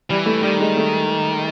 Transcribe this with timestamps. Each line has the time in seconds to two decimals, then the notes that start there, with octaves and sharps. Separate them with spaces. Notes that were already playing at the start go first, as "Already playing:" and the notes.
0.10 E3 G3
0.26 A3
0.43 D#3 G3
0.60 G#3
0.77 A3